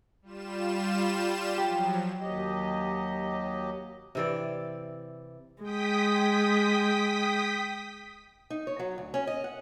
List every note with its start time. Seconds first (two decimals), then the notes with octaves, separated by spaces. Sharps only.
0.22 G3 F4 E7
1.58 F3 F#3 G4
2.20 D#2 F#3 G4 D#5
4.15 C3 E3 D5
5.62 G#3 G5 D#6 B6
8.50 D#4
8.67 C#5
8.79 F#3
8.98 D2
9.14 C#4
9.27 D#5
9.44 F#5